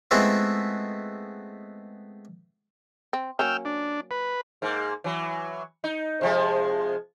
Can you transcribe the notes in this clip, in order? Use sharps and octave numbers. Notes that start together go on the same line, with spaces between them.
G#3 A3 B3 C4 E4 F4
C4
F#3 A#3 C#4 G5 E6 F6
D4
B4
G#2 A#3
E3 F#3
D#4
C3 F3 G#3